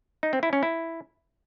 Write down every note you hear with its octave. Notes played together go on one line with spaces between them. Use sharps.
D#4
C4
E4
C#4
E4